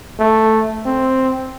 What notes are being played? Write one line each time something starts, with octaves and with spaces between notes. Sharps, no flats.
A3
C4